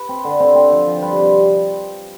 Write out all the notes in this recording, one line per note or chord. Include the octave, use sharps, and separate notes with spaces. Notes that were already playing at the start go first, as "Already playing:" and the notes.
Already playing: B4
C4
D3
C4 C5
C4
F3
F3
G3 B4 C5
C5
C3
B4